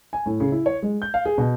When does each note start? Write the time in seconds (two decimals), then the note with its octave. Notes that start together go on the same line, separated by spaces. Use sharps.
0.13 G#5
0.26 A2
0.40 C#3
0.52 E4
0.66 C#5
0.82 G#3
1.02 G6
1.14 F5
1.25 G#4
1.38 B2